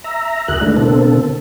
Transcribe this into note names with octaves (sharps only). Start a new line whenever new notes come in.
E5 A#5
D2 F#4 G#4 A#4 F#6
G#3 A3 D4 E4
B2 D3 A#3 C4 A4